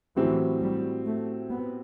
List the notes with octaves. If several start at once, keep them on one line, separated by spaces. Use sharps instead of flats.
A2 E3 F#3 C4 G4
G3
A3
B3